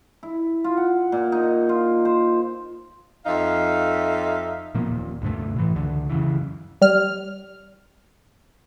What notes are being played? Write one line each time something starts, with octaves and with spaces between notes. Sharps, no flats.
E4
F4
F#5
A#2
D#4
F4
C5
F2 D#4 E5 F5
A#2 F3 A#3 B3
D#1 A#2
D2 G2 C3 A3
A2 E3
C#2 D3
F#2 C#3 E3
G3 F6